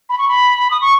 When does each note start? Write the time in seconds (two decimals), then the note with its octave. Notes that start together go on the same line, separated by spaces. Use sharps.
0.09 B5
0.18 C#6
0.28 B5
0.70 D#6
0.81 C#6